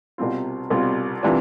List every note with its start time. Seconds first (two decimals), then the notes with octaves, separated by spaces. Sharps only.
0.18 C2 B2 G3 C4 F4
0.70 C2 B2 G3 C4 F4
1.23 C3 E3 G3 D4 F4